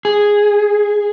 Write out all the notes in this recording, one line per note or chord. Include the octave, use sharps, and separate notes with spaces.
G#4